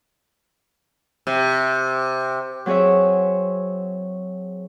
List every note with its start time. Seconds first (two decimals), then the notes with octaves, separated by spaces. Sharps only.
1.27 C3
2.66 F#3 C4 G#4 C#5 E5